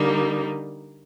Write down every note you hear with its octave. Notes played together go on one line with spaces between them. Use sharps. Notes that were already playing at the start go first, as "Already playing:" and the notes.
Already playing: D3 G3 A#3 D#4